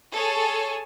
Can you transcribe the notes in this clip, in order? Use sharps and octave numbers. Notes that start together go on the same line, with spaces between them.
G#4 A4 C#5 G#5 A5